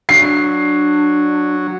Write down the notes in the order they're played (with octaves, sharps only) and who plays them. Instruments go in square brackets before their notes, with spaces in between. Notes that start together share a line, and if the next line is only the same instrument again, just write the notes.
[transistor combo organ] F#3 [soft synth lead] D4 [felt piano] C7